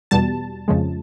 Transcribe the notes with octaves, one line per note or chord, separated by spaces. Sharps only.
E2 B2 G3 A5
F2 C#3 F3 G#3